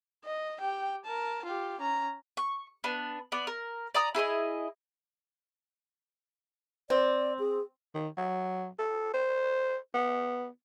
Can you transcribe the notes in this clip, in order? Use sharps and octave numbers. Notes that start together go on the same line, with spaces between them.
D#5
G4 G5
A#4 A5
F4 G4
C#4 A#5
C#6
B3 D4
B3 D5
A#4
D5 A#5 D#6
E4 G#4 C5 D#5
C4 D5
G#4
D#3
F#3
A4
C5
B3